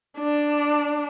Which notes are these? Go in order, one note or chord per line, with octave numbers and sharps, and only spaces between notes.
D4